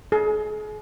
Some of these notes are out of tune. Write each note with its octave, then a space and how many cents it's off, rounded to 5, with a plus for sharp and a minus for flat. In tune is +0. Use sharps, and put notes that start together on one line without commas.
G#4 +40